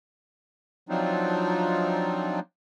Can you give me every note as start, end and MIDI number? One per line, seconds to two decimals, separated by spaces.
0.89 2.40 53
0.89 2.40 54
0.89 2.40 60
0.89 2.40 62
0.89 2.40 63
0.89 2.40 65